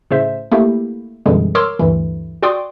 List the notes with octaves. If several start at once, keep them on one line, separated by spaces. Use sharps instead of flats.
A2 C#3 C5 E5
A3 A#3 E4 G4
F#2 B2 D3 E3 G3 G#3
A#4 C#5 C6 D6 E6 F6
D2 G2 D3 E3
F#4 D5 G5 C6 D6 D#6